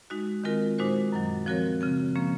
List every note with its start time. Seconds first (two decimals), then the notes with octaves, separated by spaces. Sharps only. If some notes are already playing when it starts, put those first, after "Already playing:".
0.10 G#3 D#4 F#4
0.44 D#3 G#3 C4 F4 A#4
0.78 A#2 G#3 D#4 F#4 C5
1.13 F#2 D#3 F#3
1.46 F3 C4 F#4 A#4 C#5
1.81 C#3 F3 C4
2.16 F3 A#3 C#4